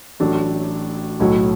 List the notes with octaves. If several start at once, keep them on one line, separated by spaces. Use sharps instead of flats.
A1 A2 F#3 A3 D4
B1 A2 F#3